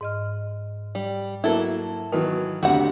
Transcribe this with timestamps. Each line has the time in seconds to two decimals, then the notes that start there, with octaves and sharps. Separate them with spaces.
0.01 G#2 D#5 F6
0.95 G3
1.44 F#3 A#3 E4 A4
2.12 D#3 E3 F#3 D#4
2.63 D2 C3 D4 F#4 G4 F#5